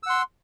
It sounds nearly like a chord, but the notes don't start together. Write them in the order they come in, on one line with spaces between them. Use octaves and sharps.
E6 F#5 C6